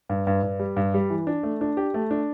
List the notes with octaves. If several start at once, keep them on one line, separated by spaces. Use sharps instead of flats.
G2
G2
G2
G3
G2
G3
E3
D4
A3
D4
G4
A3
D4